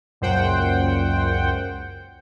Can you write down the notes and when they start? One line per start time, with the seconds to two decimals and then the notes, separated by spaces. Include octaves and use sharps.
0.21 C#2 F#2 A#2 C5 F#5 G5